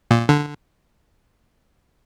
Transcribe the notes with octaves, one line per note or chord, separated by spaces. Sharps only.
A#2
D3